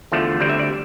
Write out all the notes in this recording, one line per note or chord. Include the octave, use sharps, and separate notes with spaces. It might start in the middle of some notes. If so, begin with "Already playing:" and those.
E2 D3 F3 A3
D2 D3 G3 C4 D5
E5
D5